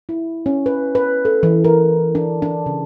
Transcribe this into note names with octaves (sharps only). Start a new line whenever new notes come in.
E4
C#4
B4
B4
A4
E3
A#4
D4
D4
C#3